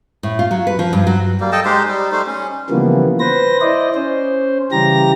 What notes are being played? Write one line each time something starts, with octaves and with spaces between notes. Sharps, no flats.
A2
F4
F#3
B4
F3
G2
F#3
G3 A#3
A4 D#5 G5 A5
G#3 D#4 G4 C5
G3 D#4
G3 A3 D#4 C5
C#4
C#3 E3 F3 G3 A#3 B3
B4 C5 A#6
E4 C5 D5 D#5
C#4 C5
C#3 E3 G3 G4 A#5 A#6